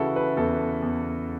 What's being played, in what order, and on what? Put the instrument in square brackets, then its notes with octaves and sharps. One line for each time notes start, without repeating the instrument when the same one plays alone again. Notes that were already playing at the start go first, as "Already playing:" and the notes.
Already playing: [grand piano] C#3 E3 E4 F#4 A4
B4
E2 A4
E2